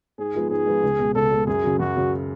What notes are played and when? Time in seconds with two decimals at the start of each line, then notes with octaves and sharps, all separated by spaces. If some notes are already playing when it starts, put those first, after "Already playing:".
0.18 G#2 G#4
0.35 F3 G#3 B3 F4
0.50 G#2 G#4
0.67 F3 G#3 B3 F4
0.83 C#2
0.99 B2 G#3
1.15 C#2 A4
1.31 B2 G#3
1.47 F#2 G#4
1.63 C#3 F#3
1.79 F#2 F#4
1.95 C#3 F#3